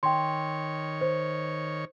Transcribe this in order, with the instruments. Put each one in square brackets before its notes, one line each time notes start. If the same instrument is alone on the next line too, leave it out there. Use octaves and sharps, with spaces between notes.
[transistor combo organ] D#3 C#5 [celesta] G5 C6
[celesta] C5